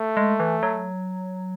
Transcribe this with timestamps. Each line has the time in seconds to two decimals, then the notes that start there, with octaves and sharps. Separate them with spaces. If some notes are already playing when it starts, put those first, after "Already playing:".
Already playing: A3
0.17 G#3
0.40 E3
0.63 F#3